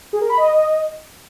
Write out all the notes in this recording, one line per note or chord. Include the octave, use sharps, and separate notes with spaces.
G#4
A#4
B5
D#5